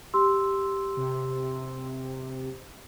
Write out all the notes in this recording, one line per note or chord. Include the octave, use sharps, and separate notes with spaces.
G4 C6 E6
C3